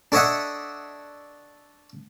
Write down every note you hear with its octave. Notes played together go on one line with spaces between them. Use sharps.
D4 A4 C#5 D#5 E5 F#5